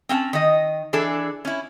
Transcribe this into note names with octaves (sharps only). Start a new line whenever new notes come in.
C4 C#4 F#5 A5
D#3 D#5
E3 D4 G#4 A4
C#4 E4